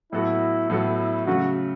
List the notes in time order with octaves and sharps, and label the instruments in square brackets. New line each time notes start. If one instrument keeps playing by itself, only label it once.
[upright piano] A2 F#3 B3 F#4 A4 [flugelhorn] E4
[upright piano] A2 F#3 B3 F#4 A4 [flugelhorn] E4
[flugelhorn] E4
[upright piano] C#3 F#3 A3 [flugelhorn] F#4